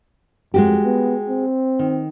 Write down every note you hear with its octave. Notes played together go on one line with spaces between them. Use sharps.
F2 G#3 F#4 G4
B3
C4
D#3